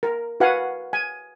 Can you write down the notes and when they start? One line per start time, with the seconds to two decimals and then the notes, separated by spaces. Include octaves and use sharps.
0.03 A#4
0.40 F#4 B4 F5 F#5 G#5
0.93 G#5